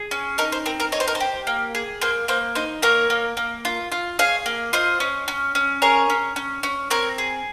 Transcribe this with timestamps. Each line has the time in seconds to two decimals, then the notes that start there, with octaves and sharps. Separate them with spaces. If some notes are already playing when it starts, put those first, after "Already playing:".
Already playing: G#4
0.11 C#4
0.38 D#4 A#4
0.52 C5
0.66 C4 A#4
0.80 A#4
0.92 D#4 C#5
1.00 C5
1.08 A#4
1.15 C5
1.20 G4
1.47 A#3
1.75 G#4
2.01 A#3 C5
2.28 A#3 C5
2.55 D#4 C5
2.82 A#3 A#4 C#5
3.10 A#3
3.37 A#3
3.65 F4
3.92 F4
4.19 G#4 C#5 F5
4.46 A#3
4.73 F4 C5 D#5
5.00 C#4
5.28 C#4
5.55 C#4
5.82 G#4 A#4 C#5
6.10 C#4
6.36 C#4
6.63 C#4
6.90 C4 A#4 C#5
7.18 G#4